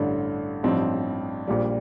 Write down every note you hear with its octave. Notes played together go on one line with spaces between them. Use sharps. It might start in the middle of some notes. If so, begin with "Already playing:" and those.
Already playing: A1 G2 D3
A1 G2 F3 C4 D#4
A#1 A#2 G3